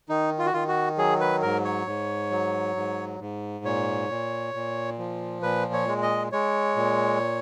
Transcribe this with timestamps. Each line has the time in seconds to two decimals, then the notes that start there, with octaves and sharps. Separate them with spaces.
0.09 D#3 D#4
0.39 F4
0.46 F#4
0.53 D#3 F4
0.68 F#4
0.98 F#3 G#4
1.21 B4
1.42 G#2 A#4
1.65 C#5
1.87 G#2
2.31 F#3
2.76 G#2
3.20 G#2
3.65 A#2 C#5
4.09 A#2
4.54 A#2
4.99 F3
5.43 A#2 B4
5.73 C#5
5.88 G#3
6.02 D#5
6.32 G#3 C#5
6.76 A#2